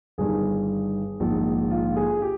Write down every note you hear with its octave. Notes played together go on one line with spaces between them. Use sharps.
G1 G2 D#3 G#4
A#1 G#2 D#3
F4
G#4
F4
G4